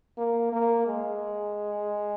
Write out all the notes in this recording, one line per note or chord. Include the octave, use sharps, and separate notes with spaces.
A#3
A#3
G#3